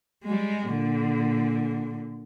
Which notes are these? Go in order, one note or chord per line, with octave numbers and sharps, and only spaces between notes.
G3 G#3
A#2 D3